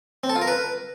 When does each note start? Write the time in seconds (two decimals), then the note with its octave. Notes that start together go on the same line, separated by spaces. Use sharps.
0.24 C4
0.30 A4
0.35 F4
0.41 A#4
0.47 B4